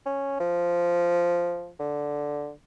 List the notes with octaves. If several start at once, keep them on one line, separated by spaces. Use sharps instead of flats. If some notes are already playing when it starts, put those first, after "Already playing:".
C#4
F3
D3